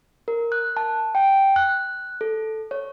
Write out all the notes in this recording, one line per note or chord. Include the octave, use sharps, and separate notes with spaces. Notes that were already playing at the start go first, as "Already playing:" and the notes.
A#4
F#6
A5
G5
F#6
A4
C#5